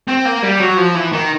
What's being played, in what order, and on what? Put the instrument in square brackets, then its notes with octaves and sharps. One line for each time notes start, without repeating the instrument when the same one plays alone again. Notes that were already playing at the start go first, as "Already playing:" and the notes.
[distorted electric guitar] C4
A#3
G3
F#3
F3
E3
D#3